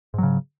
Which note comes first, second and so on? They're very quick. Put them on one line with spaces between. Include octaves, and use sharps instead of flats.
G#2 F#3 C#3